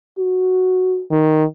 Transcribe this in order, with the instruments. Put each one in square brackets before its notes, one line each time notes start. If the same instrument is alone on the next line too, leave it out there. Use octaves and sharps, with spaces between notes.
[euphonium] F#4
[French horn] D#3